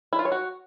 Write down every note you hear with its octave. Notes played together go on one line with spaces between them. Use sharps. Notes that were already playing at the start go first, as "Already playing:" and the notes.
E4
F4
C#5
F#4